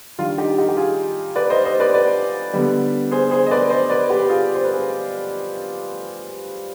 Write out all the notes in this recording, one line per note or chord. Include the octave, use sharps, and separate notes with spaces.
D#3 G3 D4 F4
D#4 G4
D#4 G4
G4
F4 G#4
B4 D5
C5 D#5
C5 D#5
B4 D5
B4 D5
D3 G3 B3 D4
G#4 C5
G#4 C5
D#5
B4 D5
C5 D#5
B4 D5
G4 B4
F4 G#4
C5
B4
G#4